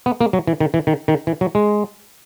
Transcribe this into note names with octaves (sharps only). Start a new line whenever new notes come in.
B3
A#3
F#3
E3
D#3
E3
D#3
D#3
E3
F#3
G#3